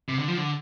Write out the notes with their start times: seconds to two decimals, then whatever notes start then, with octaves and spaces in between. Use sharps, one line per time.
0.09 C3
0.19 D3
0.28 F3
0.37 D3